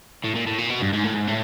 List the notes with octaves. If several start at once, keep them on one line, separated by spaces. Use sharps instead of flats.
A2
A#2
A2
A#2
B2
G2
G#2
A2
G#2
A2